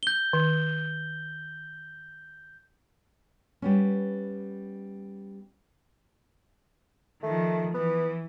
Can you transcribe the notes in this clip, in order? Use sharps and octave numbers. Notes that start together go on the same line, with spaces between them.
G6 G7
D#3
G3 B3 C#4
D#3 F3 A3
E3 B3